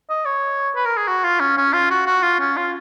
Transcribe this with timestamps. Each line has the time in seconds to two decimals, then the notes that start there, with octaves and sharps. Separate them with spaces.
0.10 D#5
0.25 C#5
0.76 B4
0.86 A#4
0.97 G#4
1.08 F#4
1.24 F4
1.40 C#4
1.57 C#4
1.74 F4
1.91 F#4
2.06 F#4
2.23 F4
2.40 C#4
2.57 F4